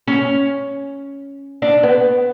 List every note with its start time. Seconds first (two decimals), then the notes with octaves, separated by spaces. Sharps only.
0.08 C#4
1.62 D4
1.83 B3